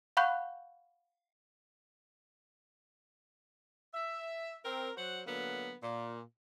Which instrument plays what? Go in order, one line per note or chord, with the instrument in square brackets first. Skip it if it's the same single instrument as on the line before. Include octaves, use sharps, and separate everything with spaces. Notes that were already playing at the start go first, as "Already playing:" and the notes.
[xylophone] F5 F#5 B5 C#6 F#6 G6
[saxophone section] E5
C4 A#4
F#3 F#4 C5 F#5
D3 F#3 A#3 B3
A#2